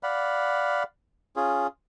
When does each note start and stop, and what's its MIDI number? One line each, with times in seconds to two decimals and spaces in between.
0.03 0.83 74
0.03 0.83 77
0.03 0.83 78
0.03 0.83 83
1.36 1.67 61
1.36 1.67 65
1.36 1.67 68